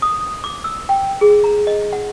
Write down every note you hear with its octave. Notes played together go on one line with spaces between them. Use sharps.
D#6
D6
E6
G5
G#4
A#5
D#5
F#5